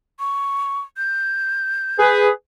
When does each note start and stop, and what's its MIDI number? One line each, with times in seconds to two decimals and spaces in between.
0.19 0.81 85
0.97 2.22 91
1.99 2.29 68
1.99 2.29 71